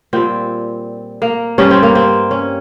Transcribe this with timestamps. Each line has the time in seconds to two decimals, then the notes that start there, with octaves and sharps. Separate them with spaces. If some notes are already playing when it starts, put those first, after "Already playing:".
0.13 A#2 G3 C4
1.22 A#3
1.58 G2 G3 C#4
1.71 C4
1.83 A#3
1.95 C4
2.31 C#4